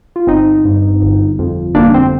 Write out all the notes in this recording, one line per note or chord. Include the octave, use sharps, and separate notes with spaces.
F4
G1 C4 D#4
G2
G1
F2
G1 A#3 D4
C4